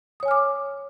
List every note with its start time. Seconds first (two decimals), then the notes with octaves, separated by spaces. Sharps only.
0.20 D#6
0.23 C#5
0.25 G#5
0.28 F6
0.31 D6